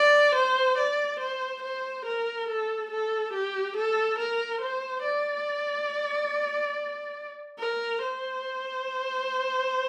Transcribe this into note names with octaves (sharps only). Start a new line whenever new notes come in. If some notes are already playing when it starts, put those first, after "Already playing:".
Already playing: D5
C5
D5
C5
C5
A#4
A4
A4
G4
A4
A#4
C5
D5
A#4
C5